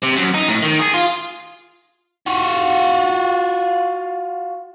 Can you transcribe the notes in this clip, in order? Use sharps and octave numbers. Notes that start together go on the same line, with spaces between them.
C3
F#2
D#4
A2
D#3
G#4
F4
F4 F#4